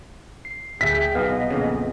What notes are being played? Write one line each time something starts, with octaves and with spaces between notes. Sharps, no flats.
C7
D2 G#4 E5 G5 B6
B1 B3 D#5 F5
A#1 F2 C#3